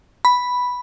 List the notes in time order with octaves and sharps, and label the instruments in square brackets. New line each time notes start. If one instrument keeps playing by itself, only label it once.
[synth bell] B5